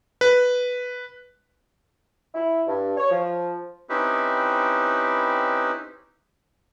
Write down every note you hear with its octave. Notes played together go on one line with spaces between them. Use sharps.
B4
E4
G2
C#5
F3
C4 C#4 D#4 E4 G4 B4